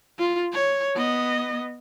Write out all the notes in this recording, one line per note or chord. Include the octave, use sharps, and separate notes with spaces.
F4
C#5
B3 D#5